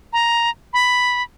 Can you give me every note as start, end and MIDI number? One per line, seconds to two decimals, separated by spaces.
0.13 0.50 82
0.73 1.22 83